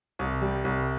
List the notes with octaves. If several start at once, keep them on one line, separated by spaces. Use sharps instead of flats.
C2
G3
C2